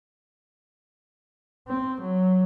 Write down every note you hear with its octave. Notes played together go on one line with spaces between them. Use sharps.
C4
F#3